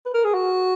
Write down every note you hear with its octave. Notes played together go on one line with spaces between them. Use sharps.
B4
A#4
G#4
F#4